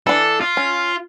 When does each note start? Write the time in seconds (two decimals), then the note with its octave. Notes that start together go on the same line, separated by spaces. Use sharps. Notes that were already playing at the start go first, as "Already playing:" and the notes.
0.07 E3 D4 A4
0.41 F4
0.57 C#4